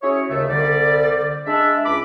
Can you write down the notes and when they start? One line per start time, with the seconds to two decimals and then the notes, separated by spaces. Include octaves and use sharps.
0.03 C#4 E4 F#4 G#4 C#5
0.29 D#2 C#3 A3 E5
0.48 C2 D3 G3 D5
1.46 G#3 D4 E5
1.86 C#2 B5 D6